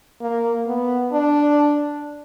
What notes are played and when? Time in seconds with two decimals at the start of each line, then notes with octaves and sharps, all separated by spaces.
0.22 A#3
0.67 B3
1.13 D4